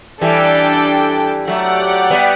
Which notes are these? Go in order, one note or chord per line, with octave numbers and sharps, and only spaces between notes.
E3 G3 D4 A4 D5 G5
F#3 A3 G4 D5 F#5
G3 B3